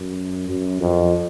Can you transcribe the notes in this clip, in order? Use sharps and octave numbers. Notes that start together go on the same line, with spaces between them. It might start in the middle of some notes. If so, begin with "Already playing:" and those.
Already playing: F#2
F#2
F2